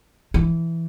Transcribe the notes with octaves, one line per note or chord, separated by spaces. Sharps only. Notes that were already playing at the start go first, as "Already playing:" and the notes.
E3